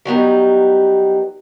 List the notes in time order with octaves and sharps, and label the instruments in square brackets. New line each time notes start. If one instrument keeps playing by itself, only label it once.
[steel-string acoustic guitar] F#3 G3 B3 D#4